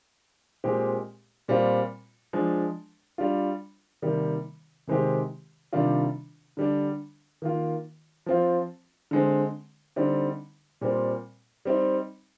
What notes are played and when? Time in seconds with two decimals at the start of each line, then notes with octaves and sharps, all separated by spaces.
0.64 A#2 G#3 C4 G4
1.48 A#2 G3 C4 F4
2.33 F3 G#3 D4
3.18 G3 D4 F4
4.02 C3 D#3 G3 A#3
4.87 C3 D#3 G#3 C4 G4
5.73 C3 D#3 G3 D4 F4
6.57 D3 G3 D4
7.42 D#3 A#3 F4
8.26 F3 C4 F4
9.11 D3 G#3 C4
9.96 D3 G3 C4 D#4
10.81 A#2 G3 C4
11.65 G3 C4 D#4